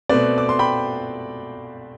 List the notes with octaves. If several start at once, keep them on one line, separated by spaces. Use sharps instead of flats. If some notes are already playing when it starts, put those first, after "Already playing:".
B2 A3 C4 B4 D5
D6
C6
G5 B5